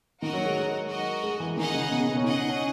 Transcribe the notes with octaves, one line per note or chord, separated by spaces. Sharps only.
D#3 F#4 A#4 D#5 F#5
F#3
G#3
G#3
F#4 A#4 D#5
G#3
E3
D#3 D#4 G#4 D#5 F#5
C#3
B2
C#3
B3
C#4
D#4 G#4 D#5 F#5
D#4
C#4